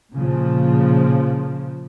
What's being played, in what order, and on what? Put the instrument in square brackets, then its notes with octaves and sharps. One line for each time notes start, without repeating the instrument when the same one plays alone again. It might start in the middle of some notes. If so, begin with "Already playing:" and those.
[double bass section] A#2 C#3 F3